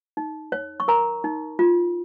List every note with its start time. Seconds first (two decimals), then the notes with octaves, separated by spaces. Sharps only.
0.17 D#4
0.52 C#5
0.80 C#6
0.88 A#4 A#5
1.24 D#4
1.59 F4